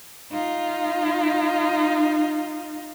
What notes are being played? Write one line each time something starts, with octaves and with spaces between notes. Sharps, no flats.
D#4 F4